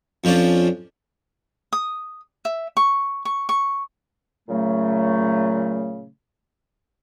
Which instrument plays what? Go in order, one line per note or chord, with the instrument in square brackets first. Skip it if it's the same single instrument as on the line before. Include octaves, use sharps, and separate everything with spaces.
[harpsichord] F2 F3 C#4 D4
[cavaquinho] D#6
E5
C#6
C#6
C#6
[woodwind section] A#2 C#3 F#3 A3